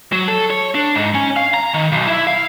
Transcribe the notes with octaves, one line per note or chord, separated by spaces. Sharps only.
F#3
A4
C#5
D4
G#2
C#4
F5
A#5
D#3
B1
E4
F5